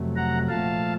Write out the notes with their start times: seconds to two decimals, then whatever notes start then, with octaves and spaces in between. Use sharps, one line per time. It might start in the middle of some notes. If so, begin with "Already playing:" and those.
Already playing: F2 C3 F#3 A3
0.16 F#5 A#5
0.48 A#2 F3 A3 F5 A5